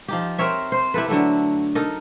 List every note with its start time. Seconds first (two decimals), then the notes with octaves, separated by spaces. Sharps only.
0.08 F3 D#4 G4
0.38 C4 A#4 C#5 E5
0.72 C5
0.94 E4 G4 A4 B4
1.08 D3 F#3 A3 E4
1.75 D#4 A4 A#4 D#5